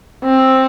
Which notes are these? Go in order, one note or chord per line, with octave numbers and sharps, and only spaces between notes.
C4